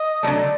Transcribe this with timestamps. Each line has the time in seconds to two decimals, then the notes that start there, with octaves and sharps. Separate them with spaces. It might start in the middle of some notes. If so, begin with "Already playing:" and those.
Already playing: D#5
0.23 D3 F#3 A3 D5